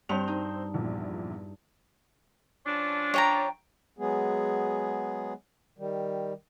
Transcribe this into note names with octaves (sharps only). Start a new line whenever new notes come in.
G2 C4 C5 F7
D#4
A#1 E2 A#2
F3 C#4 D4
C#5 G5 A#5
F#3 G#3 B3 G#4
D#3 G3